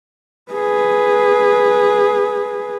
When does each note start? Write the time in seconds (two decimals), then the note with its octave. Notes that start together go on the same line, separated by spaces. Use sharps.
0.52 G#4 B4